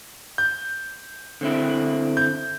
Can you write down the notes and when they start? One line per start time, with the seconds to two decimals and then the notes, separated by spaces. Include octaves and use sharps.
0.38 G6
1.41 D3 C4 E4
2.17 G6